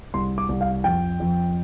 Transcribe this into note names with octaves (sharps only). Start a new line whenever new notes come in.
C2 C6
D6
C2
F5
F2 G5
F2